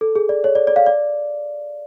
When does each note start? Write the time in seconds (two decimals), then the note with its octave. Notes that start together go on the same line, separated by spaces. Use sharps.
0.01 A4
0.16 G#4
0.29 D5
0.44 C#5
0.55 D5
0.67 D5
0.76 F5
0.86 D5